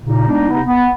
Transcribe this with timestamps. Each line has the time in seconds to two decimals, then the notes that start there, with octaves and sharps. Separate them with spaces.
0.02 A#2 C#3 D#4
0.28 G#3 A3 B3 D4 D#4
0.50 C3 B3 D#4
0.66 B3